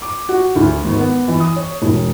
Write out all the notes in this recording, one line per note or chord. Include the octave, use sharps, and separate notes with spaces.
D6
F#4
D2
G#1
B3
E3
D#6
C#5
E1